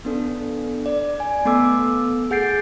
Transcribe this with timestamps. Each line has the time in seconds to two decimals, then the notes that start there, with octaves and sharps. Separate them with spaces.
0.05 B3 D4 A4
0.86 D5
1.20 G#5
1.45 A3 B3 A4 D6 E6
2.31 G#4 F#5 G6 A6 C7 D7